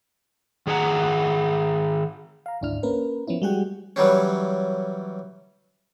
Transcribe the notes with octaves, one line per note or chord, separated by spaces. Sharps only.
D#3 G#4 C#5 F#5 A#5
F5 A#5
G#1 D2 D4 E4 F6
A#3 C#4 A#4 B4
F3 B3 C#4 E4
G3 G#3 F#4 G#4 F#5 G5
E3 F#3 G3 C#4